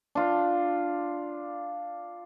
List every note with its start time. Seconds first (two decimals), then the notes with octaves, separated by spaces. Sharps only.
0.15 D4 F4